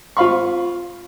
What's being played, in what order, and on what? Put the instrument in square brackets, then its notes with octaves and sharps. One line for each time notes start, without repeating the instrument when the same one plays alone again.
[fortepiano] F4 C5 F5 B5 C#6